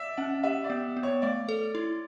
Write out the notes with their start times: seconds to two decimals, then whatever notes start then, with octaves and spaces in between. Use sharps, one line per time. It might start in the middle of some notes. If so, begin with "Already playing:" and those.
Already playing: D5 E5
0.17 C#4 F#5
0.43 G4 E5
0.64 D5
0.70 B3
0.97 B3
1.03 C#5
1.22 A3 D5
1.49 A4
1.75 E4